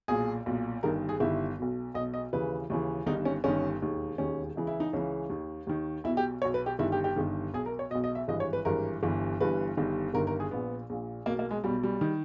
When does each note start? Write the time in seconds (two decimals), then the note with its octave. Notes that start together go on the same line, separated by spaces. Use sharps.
0.08 B1 A#2 G#4
0.46 B1 A#2
0.83 G1 G2 D#3 A#4
1.09 G#4
1.20 G1 G2 D#3 E4
1.58 B1 B2
1.94 B1 D#5
1.98 B2
2.14 D#5
2.33 D#2 C#3 E3 B4
2.70 D#2 C#3 E3
3.06 G1 G2 D#3 D#4
3.25 C#4
3.44 G1 G2 D#3 C#4
3.81 E1 D#2 D#3
4.18 E1 D#2 D#3 C#4
4.55 C#2 C#3 E3
4.67 E4
4.80 D#4
4.93 C#2 C#3 E3 C#4
5.30 D#2 D#3
5.67 D#2 D#3
6.04 B1 E4
6.07 B2
6.17 G4
6.42 B1 B2 C#5
6.54 B4
6.66 G4
6.79 G1 G2 D#3 E4
6.92 G4
7.04 G4
7.16 G1 G2 D#3
7.54 B1 B2 G#4
7.66 A#4
7.79 C#5
7.90 B2 D#5
7.95 B1
8.04 D#5
8.15 E5
8.28 G#1 G2 E3 D#5
8.40 C#5
8.53 B4
8.65 G#1 G2 E3 A#4
9.03 G1 G2 E3
9.41 G1 G2 E3 B4
9.77 G1 G2 D#3
10.14 G1 G2 D#3 A#4
10.27 A#4
10.40 G#4
10.51 A#1 A#2 B3
10.90 A#1 A#2
11.26 B1 B2 A#3
11.39 A#3
11.51 G#3
11.64 B1 B2 G3
11.83 G3
12.01 D#3